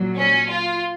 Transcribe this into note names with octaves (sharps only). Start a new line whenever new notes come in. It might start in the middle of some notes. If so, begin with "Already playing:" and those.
Already playing: A#2 F#3
C#4
F4